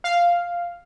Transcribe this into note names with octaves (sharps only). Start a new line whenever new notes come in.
F5